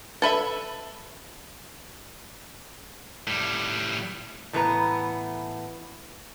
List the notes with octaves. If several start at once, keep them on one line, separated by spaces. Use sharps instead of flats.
A4 B4 E5 B5
A2 G3
A2 E3 B3 B4 A#5